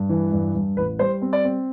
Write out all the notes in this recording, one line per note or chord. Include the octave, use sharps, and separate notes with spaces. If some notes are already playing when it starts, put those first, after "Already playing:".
Already playing: G2
E3
G2
G2
A1 B4
G3 C5
C4
D5
C4